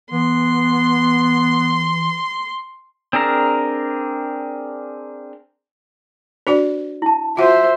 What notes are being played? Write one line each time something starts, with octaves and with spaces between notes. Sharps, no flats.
E3 B3 C6
C4 D4 G#4 A#4 A#5
D4 F#4 C5 D5
E4 A5
F4 F#4 C5 E5 F#5